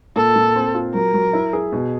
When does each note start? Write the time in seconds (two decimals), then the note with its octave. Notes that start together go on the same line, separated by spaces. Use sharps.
0.16 A#2 A4
0.36 A#2
0.56 C4
0.74 F4
0.94 F#3 A#4
1.14 F#3
1.33 E4
1.53 G#4
1.72 B2